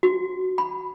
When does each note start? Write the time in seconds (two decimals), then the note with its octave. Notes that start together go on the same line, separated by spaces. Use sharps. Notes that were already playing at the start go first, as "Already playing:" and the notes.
0.03 F#4
0.58 B5